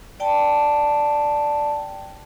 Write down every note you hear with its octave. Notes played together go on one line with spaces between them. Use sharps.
D5 G5 A5